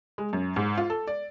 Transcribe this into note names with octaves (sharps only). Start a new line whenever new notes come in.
G#3
F#2
G#2
F4
A4
D5